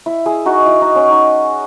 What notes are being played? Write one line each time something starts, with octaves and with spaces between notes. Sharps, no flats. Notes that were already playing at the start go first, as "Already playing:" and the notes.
E4
E4 G#4
D#4 F#4
E4
D#4
C#4
D#4